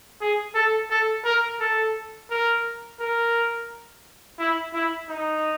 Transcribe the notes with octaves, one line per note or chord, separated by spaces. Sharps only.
G#4
A4
A4
A#4
A4
A#4
A#4
E4
E4
D#4